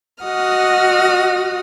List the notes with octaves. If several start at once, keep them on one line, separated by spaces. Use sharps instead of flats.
F#4 D#5 F#5 D#6 F6